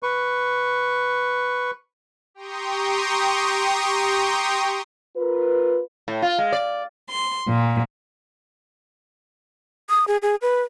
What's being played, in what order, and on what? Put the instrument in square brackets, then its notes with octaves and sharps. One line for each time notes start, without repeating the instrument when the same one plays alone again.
[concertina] B4 C#6
[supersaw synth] G4 G5 A#5 C6 C#6 D#6
[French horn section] F4 A#4 B4
[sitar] A2
F4
G#3
D5
[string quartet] C6
A#2
[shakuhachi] D#6
G#4
G#4
B4